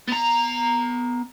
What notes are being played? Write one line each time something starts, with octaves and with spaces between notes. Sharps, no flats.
B3 A#5